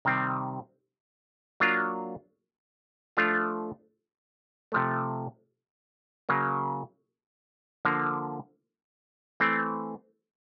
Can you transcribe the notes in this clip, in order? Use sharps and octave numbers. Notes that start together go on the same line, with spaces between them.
C3 D#3 G3 C4
F#3 A#3 D4 F4
F3 A3 D4 F4
C3 F3 A3
C#3 F#3 A#3
D3 F3 A#3
E3 A3 C4